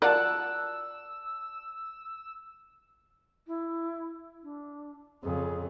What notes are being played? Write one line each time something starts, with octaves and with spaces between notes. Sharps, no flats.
F4 F#4 A#4 D5 F#5 A5 E6 F#6
E4
D4
F2 C#3 G#4